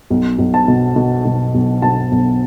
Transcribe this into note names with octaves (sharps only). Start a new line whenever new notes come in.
B1
B1
A5
B2
B2
B2
B1
B2 A5
B1